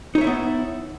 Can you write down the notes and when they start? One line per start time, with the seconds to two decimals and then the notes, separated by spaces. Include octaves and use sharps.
0.15 D#4
0.18 C#5
0.21 E5
0.24 E4
0.27 B3